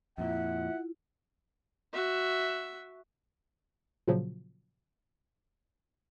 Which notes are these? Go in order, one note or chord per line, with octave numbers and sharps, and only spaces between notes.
F2 A#2 E4 F4 E5 F#5
F#4 E5
A#2 C#3 F3 F#3